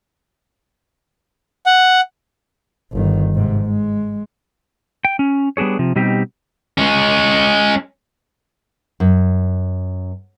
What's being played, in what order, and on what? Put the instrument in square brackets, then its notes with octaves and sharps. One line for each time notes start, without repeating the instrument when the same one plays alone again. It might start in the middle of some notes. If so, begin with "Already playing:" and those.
[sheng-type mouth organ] F#5
[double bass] G1 D#3
G#2 C3
G#3
[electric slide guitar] G5
C#4
G3 B3 D4 G#4 C#5
C3 F3
B2 G3 C4 D#4 G4
[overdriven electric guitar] G#3 C#4
[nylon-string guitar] F#2